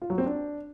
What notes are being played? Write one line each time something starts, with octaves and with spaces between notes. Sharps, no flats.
F4
F#3
C4
D4